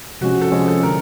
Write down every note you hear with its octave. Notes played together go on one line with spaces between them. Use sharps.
C3 F3 G#3 C#4 F#4
A4
C3 F3 G#3 C#4
A4
D3 A#4